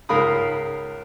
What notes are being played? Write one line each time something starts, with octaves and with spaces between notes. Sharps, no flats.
C#2 G#2 A#4 F5 B5 D#6